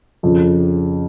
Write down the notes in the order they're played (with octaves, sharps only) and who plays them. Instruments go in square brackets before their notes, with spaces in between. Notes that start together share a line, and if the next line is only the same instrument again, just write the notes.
[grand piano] F2 C#3 F3